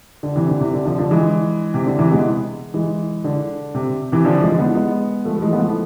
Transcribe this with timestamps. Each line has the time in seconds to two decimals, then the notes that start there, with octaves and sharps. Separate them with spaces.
0.23 D3
0.36 C3 E3
0.48 D3
0.60 C3
0.74 D3
0.86 D3 F3
0.98 D3 F3
1.11 E3 G#3
1.74 C3
1.86 D3
1.99 C3 E3
2.12 G#3 B3
2.74 E3 G#3
3.24 D3
3.75 C3
4.12 C3 E3
4.25 D3 F3
4.42 E3 G#3
4.58 G#3 B3
4.75 G#3 B3
5.25 F3 A3
5.37 A3
5.42 E3 G#3
5.53 B3
5.59 F3 A3